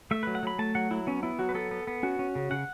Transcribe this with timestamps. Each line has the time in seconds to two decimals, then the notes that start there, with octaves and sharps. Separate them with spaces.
0.11 A3 E5
0.23 F#3 B4
0.35 F#5
0.43 F#3 B5
0.59 A3 A5
0.75 F#3 F#5
0.91 F#3 E4
1.07 B3 C#4
1.23 B3 E4
1.39 F#3 F#4
1.49 B4
1.55 B3 A4
1.71 B3
1.87 B3
2.03 C#4 F#4
2.19 C#4
2.35 C#3
2.51 C#3 F#5